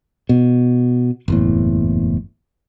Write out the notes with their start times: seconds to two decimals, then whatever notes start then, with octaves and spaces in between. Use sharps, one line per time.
0.29 B2
1.28 F#1 E2 A2